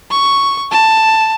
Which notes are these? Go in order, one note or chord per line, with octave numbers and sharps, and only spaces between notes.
C#6
A5